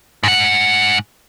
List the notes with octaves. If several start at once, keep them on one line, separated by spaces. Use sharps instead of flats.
G#2 F#5